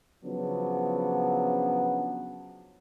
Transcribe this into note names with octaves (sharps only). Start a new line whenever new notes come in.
C#3 F3 F#3 B3 D4